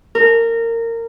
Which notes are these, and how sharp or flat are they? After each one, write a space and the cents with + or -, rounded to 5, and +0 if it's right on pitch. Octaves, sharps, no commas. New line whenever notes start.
A#4 -20